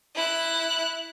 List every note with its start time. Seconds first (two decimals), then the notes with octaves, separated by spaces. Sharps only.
0.15 E4 F#6